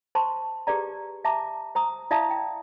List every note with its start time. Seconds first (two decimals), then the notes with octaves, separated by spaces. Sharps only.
0.15 C5 A5 C6 C#6
0.67 G4 G#4 B4 D5 A#5
1.25 E5 A5 A#5 D6
1.75 C5 A#5 D#6
2.11 E4 D5 E5 F5 A5 D#6
2.31 G5